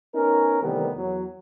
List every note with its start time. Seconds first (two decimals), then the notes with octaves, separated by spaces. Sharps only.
0.15 B3 C#4 D#4 A#4
0.62 C3 D#3 E3 G3 A3 B3
0.96 E2 F#3